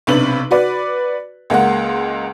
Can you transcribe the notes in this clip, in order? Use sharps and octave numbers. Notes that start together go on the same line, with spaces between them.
B1 C3 D4 B4 F#7
F#4 B4 D5
C#2 G#3 A#3 F#5